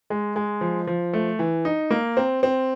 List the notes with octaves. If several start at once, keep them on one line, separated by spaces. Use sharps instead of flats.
G#3
G#3
F3
F3
A3
E3
D#4
A#3
C4
C4